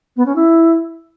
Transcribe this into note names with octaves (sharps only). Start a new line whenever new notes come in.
B3
C#4
E4